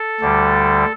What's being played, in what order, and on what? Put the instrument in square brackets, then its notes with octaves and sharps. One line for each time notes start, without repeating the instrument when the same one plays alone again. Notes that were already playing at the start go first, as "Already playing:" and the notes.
Already playing: [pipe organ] A4
D2 D3 G3